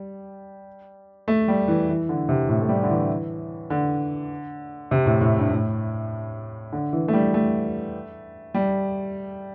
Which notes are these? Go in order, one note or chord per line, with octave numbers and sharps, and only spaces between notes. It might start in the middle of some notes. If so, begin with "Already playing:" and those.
Already playing: G3
A3
G3
E3
E3
D3
C3
A2
A3
G3
D3
E3
D3
C3
A2
A2
G2
A2
D3
E3
A3
G3
A3
G3